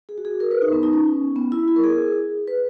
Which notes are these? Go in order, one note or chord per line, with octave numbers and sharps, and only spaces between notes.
G#4
F#4
G#4
A#4
B4
D#4
B3
D#4
C#4
B3
E4
E4
A#4
G#4
B4